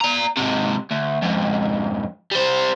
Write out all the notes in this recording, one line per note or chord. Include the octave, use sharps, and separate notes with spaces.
D5 A#5
G#2 C3
D2
F2 G#2
G3 C5